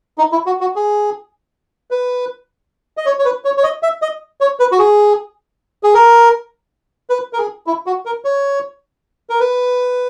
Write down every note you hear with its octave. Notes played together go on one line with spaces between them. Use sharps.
D#4
E4
F#4
F#4
G#4
B4
D#5
C#5
C#5
B4
C#5
C#5
D#5
E5
D#5
C#5
B4
F#4
G#4
G#4
A#4
B4
A#4
G#4
E4
F#4
A#4
C#5
A#4
B4